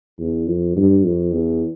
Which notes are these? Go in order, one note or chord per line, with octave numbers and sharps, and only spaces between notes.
E2
F2
G2
F2
E2